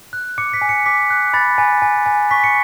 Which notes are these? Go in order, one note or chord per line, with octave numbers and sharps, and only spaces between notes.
F#6
D6 C#7
B6
G#5
C#7
D6 B6
F#6
B5 A6
G#5
G#5
G#5
C#6 B6
C#7